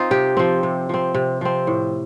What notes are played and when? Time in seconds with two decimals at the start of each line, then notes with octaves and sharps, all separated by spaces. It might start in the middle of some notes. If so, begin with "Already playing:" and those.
Already playing: C4 D#4 F4
0.11 C3 G4
0.37 F3 C4
0.63 C3
0.89 F3 C4
1.15 C3
1.41 F3 C4
1.67 A2